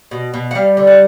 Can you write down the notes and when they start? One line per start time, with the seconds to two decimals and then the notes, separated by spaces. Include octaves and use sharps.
0.11 B2
0.34 B2
0.51 F#5
0.55 G3 F5
0.77 D3
0.87 F#5